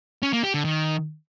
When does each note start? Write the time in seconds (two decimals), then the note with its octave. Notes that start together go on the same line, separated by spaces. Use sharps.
0.23 C#4
0.33 A#3
0.44 G4
0.54 D3
0.65 D#3